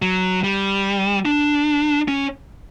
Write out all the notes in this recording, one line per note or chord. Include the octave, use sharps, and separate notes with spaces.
F#3
G3
D4
C#4